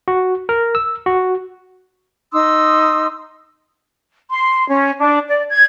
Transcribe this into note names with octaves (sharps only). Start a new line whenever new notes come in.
F#4
A#4
E6
F#4
D#4 C6 D#6 E6
C6
C#4
D4
D5
G#6